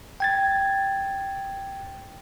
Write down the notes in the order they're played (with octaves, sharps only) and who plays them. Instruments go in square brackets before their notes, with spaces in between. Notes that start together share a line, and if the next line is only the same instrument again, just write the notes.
[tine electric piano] G5 G#6 A6